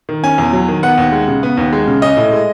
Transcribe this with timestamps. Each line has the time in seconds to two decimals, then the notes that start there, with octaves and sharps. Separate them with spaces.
0.09 D#3
0.23 C#4 G#5
0.38 E2
0.53 F#3
0.68 D#3
0.83 B3 F#5
0.98 D#2
1.12 G#3
1.28 C#3
1.43 B3
1.57 D#2
1.73 G#3
1.87 C#3
2.02 C#4 D#5
2.17 A2
2.32 G#3